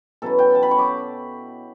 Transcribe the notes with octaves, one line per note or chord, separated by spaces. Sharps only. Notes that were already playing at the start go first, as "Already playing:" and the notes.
B2 F#3 C#4 E4 A4
G5
A5
B5
C#6
D6